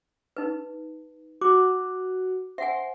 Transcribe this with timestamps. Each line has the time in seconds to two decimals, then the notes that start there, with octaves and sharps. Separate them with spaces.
0.37 D#4 B4
1.41 F#4 D6
2.58 C5 E5 F#5 G#5